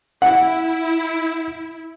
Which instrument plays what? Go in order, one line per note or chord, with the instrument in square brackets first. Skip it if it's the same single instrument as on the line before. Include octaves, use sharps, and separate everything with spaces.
[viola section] E4 [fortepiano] F#5